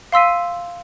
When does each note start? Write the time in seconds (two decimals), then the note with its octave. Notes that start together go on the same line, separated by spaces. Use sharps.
0.12 F5 C6 E6 B6 D#7